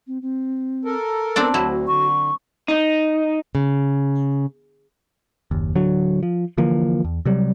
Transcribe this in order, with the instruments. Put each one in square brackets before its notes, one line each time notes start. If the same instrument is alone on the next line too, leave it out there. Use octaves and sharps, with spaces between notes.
[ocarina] C4
C4
[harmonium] A4 A#4
[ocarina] B3 [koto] C4 D4 D5 [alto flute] A5
[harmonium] D2 [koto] F#3 E4 [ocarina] F#4
[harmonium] D3 [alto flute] C#6
[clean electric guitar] D#4
[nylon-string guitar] C#3
[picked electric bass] F#1 D#2
D1 D3 F#3
F3
D3 E3 F3 A#3
E2
C3 F#3 G3